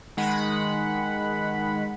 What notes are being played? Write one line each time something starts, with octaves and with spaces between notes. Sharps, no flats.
D#3 G#3 F#5 B5